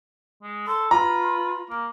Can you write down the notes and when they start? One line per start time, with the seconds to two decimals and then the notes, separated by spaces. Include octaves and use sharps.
0.43 G#3
0.67 A4 C6
0.91 F4 B4 A#5
1.70 A#3